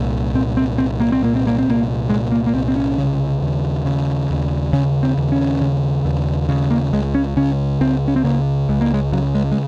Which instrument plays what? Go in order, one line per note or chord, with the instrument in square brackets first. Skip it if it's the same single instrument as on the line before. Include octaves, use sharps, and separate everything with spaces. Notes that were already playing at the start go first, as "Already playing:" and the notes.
Already playing: [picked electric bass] C2 A#2
A#2 C4
C4
C2 C4
A#3
C4
A#2 A#3
C4
A#3
C4
C2 A#3
A#2 G#3
A#3
A#3
C2 C4
C4
C#4
C#3
D#2
C#3
D#2
C#3 C#4
C4
D#2
C#4
C#3
D#2
C#3
A#3
C#2 G#3
C#4
C#3 C#4
C#2 C4
C#4
C4
C#3 A#3
C#2 G#3
A#3
G#3
C#3 F#3
G#3
G#3